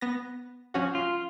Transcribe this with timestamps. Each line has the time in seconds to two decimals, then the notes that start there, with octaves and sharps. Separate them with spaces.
0.01 B3 A#6
0.74 F3 C#4 F#4
0.95 F4